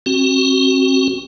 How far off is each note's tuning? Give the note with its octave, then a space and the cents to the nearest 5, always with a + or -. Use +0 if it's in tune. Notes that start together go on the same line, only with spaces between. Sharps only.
C4 +35 F#4 +5